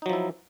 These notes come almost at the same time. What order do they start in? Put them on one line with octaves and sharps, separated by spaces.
D#4 F#3 F3 E4